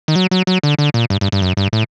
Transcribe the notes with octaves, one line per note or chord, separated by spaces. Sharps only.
D#3
F#3
F#3
F#3
D3
D3
A#2
G2
G2
G2
F#2
G2
A2